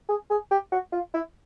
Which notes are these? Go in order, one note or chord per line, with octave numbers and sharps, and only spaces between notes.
G#4
G#4
G4
F#4
F4
E4